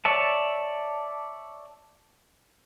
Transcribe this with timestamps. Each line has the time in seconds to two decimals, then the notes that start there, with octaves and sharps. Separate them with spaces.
0.05 C#5 D5 E5 A5